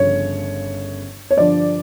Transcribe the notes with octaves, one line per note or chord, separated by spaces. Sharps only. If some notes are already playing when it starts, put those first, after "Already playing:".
Already playing: G1 C#3 F3 C#5
C#5
G2 D3 F3 D5